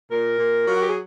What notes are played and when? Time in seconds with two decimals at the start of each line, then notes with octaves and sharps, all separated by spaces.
0.11 A#2 A#4
0.39 A#2
0.67 F#3 F4
0.74 F#4
0.80 G4
0.88 G#4